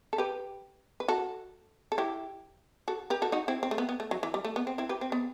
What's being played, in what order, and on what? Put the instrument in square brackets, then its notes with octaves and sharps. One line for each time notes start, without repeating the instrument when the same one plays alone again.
[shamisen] A4
G4 B4
B4
F#4 A4
A4
E4 G4
F#4 A4
G4 B4
F#4 A4
D#4 F#4
C4 E4
C4
A3
B3
B3
A3
F#3
E3
G3
A3
B3
C4
C4 E4
G4 B4
C4
B3